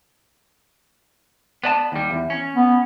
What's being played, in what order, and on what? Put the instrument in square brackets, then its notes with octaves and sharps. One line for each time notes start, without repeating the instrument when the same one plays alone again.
[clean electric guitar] B3 D5 A5
D#2 G3
E2
C#4
[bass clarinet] B3